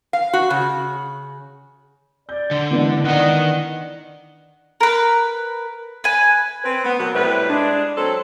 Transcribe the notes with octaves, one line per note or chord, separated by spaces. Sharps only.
F5
F#4
C#3
D5 G6
D3
E3 G#3 B3 D4
D#3 D#5 F#5
A#4 B4
B4 G#5
C4 B4
B3
B2 F#3 A#3 B3
A2 C3 G3 B4
G#3 D4
F#3 C4 A4